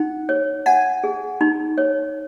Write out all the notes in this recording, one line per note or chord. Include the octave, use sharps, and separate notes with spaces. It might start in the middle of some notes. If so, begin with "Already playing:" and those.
Already playing: D#4 F#5
C#5
F#5 G#5
G#4
D#4
C#5